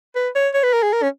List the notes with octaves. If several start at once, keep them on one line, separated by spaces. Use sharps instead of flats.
B4
C#5
C#5
B4
A#4
G#4
A#4
C#4